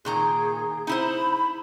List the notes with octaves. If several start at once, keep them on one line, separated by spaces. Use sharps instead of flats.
A#2 D#3 G#4 A#5
D#4 E4 C5 B5